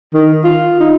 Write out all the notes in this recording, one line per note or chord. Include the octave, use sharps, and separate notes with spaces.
D#3
F4
D#4